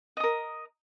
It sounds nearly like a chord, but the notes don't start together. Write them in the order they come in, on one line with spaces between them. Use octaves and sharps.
D#5 D#6 A#4